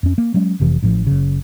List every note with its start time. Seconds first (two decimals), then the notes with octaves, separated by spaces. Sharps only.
0.03 F2 C#4
0.18 A#3
0.34 F#3 G#3 C#4
0.60 F1 F2 C3 E3
0.82 A1 A2 F3
1.07 F#1 C#3